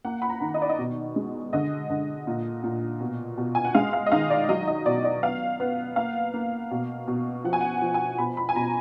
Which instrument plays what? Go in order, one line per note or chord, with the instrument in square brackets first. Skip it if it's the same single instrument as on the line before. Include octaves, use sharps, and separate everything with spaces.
[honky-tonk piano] A#3 F#5
B5
A#5
D#3
D#5
D5
D#5
B2
G#3
D3 D#5
D3
A#2
A#2
B2
B2
G#5
F#5
G#3 F5
F5
D#5
D#3 F5
D5
F#3 D#5
D#5
B2 D5
D5
B3 F5
B3
A#3 F5
A#3
B2
B2
F3 F#5
G#5
F#5
F3
G#5
B2 B5
B5
G#5
B2 A#5